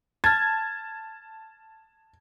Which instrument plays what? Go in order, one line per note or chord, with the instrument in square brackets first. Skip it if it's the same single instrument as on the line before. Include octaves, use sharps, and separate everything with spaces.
[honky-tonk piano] A5 G#6 [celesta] F6 A6